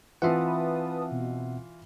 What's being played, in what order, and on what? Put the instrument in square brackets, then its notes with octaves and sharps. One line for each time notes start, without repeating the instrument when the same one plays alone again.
[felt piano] E3 F4 [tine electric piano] C4 E5 F#5 [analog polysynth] B4 A5 D#6
[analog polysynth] B2